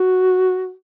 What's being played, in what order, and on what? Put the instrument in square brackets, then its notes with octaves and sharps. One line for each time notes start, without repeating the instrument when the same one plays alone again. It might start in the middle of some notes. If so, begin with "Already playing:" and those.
Already playing: [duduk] F#4